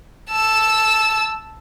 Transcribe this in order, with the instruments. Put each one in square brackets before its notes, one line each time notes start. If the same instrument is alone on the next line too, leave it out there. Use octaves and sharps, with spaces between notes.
[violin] A5 E6